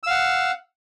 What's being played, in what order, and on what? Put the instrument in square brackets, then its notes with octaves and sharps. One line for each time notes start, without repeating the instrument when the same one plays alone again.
[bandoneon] E6
F5
F#5